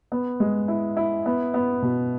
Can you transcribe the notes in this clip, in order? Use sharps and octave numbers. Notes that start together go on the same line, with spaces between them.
B3
G#3
E4
E4
B3
B3
B2